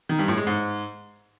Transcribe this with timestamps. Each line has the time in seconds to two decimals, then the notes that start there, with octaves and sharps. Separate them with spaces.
0.09 D#3
0.19 G2
0.28 A2
0.37 G#3
0.47 G#2